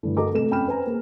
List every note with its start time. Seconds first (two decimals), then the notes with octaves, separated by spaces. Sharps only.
0.03 G2 D3 E3 A3
0.17 F#4 A4 A#4 D#5 A#5 D6
0.33 C3 A3 A4 E7
0.50 F2 C#4 G5 B5 F6 E7
0.68 B4 C5 G#5 A#5
0.87 A#3 G#4